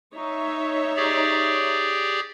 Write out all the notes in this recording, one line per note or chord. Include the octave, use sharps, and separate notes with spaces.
D#4 C#5 E5
G4 G#4 D5